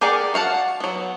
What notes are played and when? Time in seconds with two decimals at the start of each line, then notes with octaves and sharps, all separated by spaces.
0.01 G4 G#4 A#4 D5 F#5
0.34 F#4 F5 F#5 A5
0.80 F#3 B3